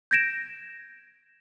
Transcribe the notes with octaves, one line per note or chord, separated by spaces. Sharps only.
G6 G#6 A#6 D7 E7